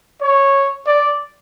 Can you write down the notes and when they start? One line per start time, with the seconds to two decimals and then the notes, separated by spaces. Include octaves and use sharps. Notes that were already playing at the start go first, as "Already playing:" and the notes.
0.20 C#5
0.86 D5